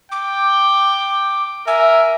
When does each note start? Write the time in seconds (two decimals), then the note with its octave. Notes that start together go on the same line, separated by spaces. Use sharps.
0.12 G5 D6
1.67 A#4 E5 G#5